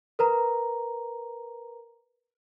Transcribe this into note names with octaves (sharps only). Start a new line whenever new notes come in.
A#4 B4 A#5